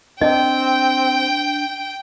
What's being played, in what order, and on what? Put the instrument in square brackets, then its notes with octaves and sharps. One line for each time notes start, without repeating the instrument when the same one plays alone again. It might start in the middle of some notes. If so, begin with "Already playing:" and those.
[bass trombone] C4 [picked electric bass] D4 [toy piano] D#5 [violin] G5